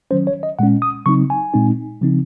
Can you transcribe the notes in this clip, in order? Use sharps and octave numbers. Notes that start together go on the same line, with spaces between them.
D#3 F#3 C#4 C5
C#5
D#5
A#2 G#3 C#4 F#5
D#6
C#3 F#3 C4 D#4 C#6
G#5
A#2 G#3 C4 D#4
C#3 F3 C4 D#4